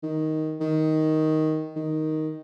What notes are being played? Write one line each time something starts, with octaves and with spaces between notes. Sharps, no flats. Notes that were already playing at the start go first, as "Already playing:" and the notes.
D#3
D#3
D#3